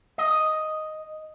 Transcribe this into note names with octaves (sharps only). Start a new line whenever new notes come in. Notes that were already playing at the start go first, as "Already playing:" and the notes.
D#5